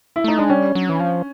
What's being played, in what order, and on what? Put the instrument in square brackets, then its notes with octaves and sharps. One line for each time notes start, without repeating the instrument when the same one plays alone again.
[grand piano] E4
[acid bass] A3 [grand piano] D#4
[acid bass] G#3 [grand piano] D4
[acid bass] G3 [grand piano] C#4
[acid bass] F#3
E3
F3